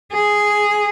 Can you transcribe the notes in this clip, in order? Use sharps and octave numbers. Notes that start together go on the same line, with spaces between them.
G#4